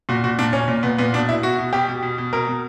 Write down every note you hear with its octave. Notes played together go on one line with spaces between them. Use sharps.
A#2 F#4
A#2 F#4
A#2 D4
A#2 C#4
A#2
A#2 B3
A#2 B3
B2 D4
B2 E4
B2 F#4
B2
B2 G4
B2
B2
B2
B2 A#4
B2